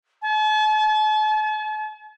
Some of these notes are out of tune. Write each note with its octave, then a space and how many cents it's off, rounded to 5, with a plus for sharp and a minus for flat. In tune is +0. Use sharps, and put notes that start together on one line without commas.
A5 -45